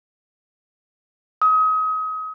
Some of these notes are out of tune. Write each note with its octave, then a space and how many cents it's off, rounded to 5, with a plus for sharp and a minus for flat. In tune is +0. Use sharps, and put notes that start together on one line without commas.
D#6 +30